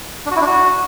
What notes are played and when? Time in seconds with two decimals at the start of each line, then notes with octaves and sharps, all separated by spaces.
0.26 D4
0.31 F#4
0.36 E4
0.41 D4
0.46 F#4